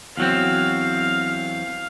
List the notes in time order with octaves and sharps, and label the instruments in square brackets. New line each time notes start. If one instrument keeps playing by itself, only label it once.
[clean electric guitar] E2 F#3 C4 [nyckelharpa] F5